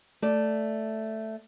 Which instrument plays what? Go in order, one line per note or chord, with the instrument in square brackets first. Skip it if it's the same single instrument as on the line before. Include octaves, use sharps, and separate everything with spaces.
[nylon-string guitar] A3 D5